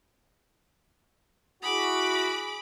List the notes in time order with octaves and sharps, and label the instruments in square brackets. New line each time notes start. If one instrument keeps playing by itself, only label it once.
[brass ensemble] E4 F#4 [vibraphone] G#4 G#5 D#6 [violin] B5 D6